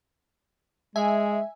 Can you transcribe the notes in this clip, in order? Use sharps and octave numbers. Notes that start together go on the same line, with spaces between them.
G#3 E5 G#5